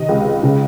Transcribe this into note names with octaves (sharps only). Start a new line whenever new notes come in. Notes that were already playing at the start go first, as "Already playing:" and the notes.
Already playing: C3 D#3 D#5
C#2
C#3